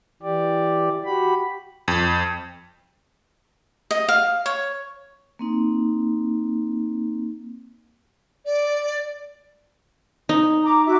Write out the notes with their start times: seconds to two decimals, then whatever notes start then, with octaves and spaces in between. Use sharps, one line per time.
0.22 E3 G4 D5
1.05 F#4 G4 B5
1.88 F2
3.91 D#5
4.08 F5
4.46 C#5
5.39 A#3 C4 D#4
8.45 D5
10.29 D#4
10.63 A#5 D6
10.85 F#4 E5 D6